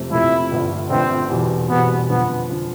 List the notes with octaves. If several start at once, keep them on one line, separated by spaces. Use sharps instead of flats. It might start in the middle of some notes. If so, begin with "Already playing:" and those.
Already playing: F2 C3 F3 A3 C4
F2 C3 F3 A3 C4 E4
G1 G2 F3 A3
G1 G2 F3 A3 C4
E2 B2 G3 C4
E2 B2 G3 B3 C4
F2 D3 F3 B3
D3 F3